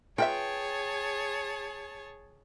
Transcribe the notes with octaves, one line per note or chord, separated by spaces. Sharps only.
F4 G#4 B4 C#5 E5 G5 A5